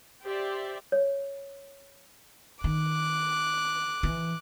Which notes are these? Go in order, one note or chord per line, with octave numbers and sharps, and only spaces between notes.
G4 C5 D5 E5
C#5
D#3 D6 F#6
E3